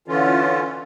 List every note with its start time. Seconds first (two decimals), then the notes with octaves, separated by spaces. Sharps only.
0.08 D3 E3 C#4 F4